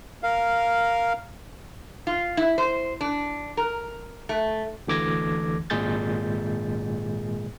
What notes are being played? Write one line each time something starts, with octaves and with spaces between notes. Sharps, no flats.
A#4 F5
F4
E4
C5
D4
A#4
A3
D2 D3 E3 D6 G#6 A#6
G#1 A#2 G#3 G#4 G6 A6